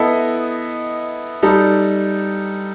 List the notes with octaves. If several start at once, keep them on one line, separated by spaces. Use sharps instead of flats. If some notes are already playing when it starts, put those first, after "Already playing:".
Already playing: B3 E4 A4 D#5
G3 D#4 A4